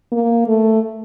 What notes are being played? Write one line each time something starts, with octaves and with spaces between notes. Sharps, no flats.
A#3
A3